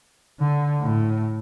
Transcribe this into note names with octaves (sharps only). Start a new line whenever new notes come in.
D3
A2